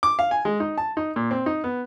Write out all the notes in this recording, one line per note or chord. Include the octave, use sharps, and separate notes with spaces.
D6
F5
G#5
G#3
D#4
A5
D#4
A#2
C4
D#4
B3